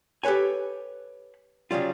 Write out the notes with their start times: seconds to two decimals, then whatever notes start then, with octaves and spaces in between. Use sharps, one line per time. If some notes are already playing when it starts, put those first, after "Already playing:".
0.24 G4 A4 B4 C#5 G#5
1.71 C#3 F#3 G3 F4